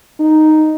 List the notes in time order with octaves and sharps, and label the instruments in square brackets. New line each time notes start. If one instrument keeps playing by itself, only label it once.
[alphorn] D#4